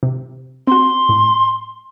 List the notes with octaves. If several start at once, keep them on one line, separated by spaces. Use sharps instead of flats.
C3
C4 F#4 C6
A2